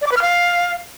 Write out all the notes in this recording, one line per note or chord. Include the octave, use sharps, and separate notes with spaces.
D5
D6
B4
F6
F5